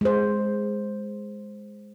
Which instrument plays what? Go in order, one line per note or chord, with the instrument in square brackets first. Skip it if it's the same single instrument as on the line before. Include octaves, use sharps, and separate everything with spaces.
[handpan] G#3 C5